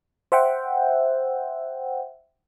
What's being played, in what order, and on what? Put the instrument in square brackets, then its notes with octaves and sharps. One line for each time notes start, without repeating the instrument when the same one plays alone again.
[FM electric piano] C5 E5 F#5 G5